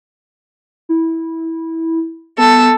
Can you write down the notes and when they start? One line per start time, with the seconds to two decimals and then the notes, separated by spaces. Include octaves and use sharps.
0.89 E4
2.38 B3 A4